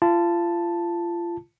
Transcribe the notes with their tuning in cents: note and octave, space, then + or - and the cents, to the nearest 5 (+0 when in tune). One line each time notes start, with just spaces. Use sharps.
F4 -30 A5 +0